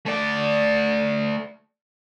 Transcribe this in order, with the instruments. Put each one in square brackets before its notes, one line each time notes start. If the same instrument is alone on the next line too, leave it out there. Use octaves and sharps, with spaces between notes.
[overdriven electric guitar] A3 D5